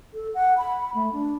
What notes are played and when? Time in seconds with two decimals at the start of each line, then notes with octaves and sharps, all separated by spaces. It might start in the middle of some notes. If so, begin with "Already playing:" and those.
0.14 A4
0.34 F#5
0.58 B5
0.94 A3
1.13 D4